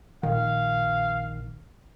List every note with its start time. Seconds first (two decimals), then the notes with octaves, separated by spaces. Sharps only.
0.23 A#1 D#3 F5